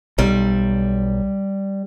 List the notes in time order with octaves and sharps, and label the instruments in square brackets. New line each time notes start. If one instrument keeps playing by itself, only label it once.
[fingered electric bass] B1 [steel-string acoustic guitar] G3